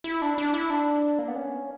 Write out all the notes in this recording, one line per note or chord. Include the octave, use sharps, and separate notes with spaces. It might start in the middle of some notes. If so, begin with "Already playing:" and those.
E4
D4
D4
E4
D4
A#3
B3
C#4